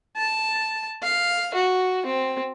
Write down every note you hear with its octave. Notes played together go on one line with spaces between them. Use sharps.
A5
F5
F#4
C4